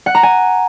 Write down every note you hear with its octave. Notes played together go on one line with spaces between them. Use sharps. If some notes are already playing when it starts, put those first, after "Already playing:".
F#5
A#5
G#5